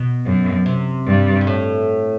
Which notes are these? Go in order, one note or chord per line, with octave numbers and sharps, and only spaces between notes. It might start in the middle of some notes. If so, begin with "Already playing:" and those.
Already playing: B2
F#2
C3
G2
G2
A2